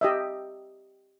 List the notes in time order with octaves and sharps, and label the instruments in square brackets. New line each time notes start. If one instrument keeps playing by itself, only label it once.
[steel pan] G4 D#5 E5